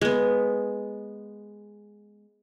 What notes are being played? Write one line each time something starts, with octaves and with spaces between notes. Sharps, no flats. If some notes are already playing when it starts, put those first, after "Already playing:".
G#3 B3